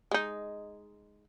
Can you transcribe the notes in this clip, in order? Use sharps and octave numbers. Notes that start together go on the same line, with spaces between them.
G#3 D#4